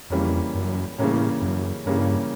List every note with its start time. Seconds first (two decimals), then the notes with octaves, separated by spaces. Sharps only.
0.10 F2 C#3 E3 G3 A#3 C#4
0.54 F#2
0.98 A2 C#3 E3 G3 A#3 C#4
1.41 F#2
1.86 G2 C#3 E3 G3 A#3 C#4